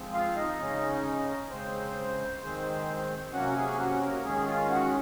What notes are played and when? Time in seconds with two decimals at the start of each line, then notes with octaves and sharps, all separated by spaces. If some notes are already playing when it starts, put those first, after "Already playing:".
Already playing: F3 G#3 C4
0.14 F4 F5
0.36 D#4 D#5
0.59 C#3 G#3 C#4
1.50 C#3 G#3 C4 C5
2.42 D#3 G#3 C4
3.33 C3 F#3 A#3 C#4 F#4 F#5
3.56 G#4 G#5
3.79 F#4 F#5
4.01 A#3 A#4
4.25 D#3 G#3 C#4 G#4
4.47 F4 F5
4.70 F#4 F#5